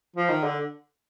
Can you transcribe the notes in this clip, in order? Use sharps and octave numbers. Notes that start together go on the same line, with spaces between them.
F3
D#3
D3